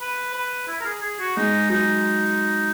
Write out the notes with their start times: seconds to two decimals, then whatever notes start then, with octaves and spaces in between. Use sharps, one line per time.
0.01 B4
0.34 B4
0.68 E4
0.81 A#4
0.85 G#4
1.03 G#4
1.20 F#4
1.37 G#3 D#4
1.70 F#3 D#4